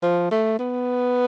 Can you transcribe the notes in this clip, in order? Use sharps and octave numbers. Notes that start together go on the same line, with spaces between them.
F3
A3
B3